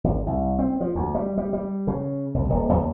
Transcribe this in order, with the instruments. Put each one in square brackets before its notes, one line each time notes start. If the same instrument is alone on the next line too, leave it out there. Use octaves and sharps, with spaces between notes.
[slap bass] G#1
C2
C4
F3
D2
G3
G3
G3
C#3
C2
D#1
D#2